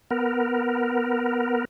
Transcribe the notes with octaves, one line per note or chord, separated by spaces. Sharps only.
B3 A#4